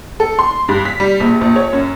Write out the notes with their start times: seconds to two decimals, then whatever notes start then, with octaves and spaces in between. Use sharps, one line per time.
0.20 A4
0.39 C6
0.69 G2
0.85 B6
1.00 G3
1.20 A#1
1.41 A#1
1.56 C#5
1.73 F#2